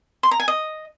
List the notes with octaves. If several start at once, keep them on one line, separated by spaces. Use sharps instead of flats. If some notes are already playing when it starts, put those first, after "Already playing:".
C6
A#5
G#5
D#5